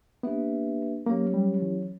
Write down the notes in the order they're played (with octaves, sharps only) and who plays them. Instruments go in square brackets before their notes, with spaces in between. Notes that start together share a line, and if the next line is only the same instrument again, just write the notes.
[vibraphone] A#3 D4 G4 B4 E5 [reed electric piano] B3
[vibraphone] F#3 C#4 G4 C#5 [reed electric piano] A#3
[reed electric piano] G3
E3